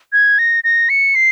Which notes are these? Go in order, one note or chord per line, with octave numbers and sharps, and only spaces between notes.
G#6
A#6
A#6
C#7
C7